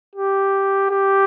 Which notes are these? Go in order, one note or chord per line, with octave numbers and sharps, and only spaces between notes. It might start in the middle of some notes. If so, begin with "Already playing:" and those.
G4
G4